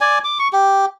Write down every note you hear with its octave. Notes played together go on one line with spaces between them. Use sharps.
D5 G#5
D6
C#6
G4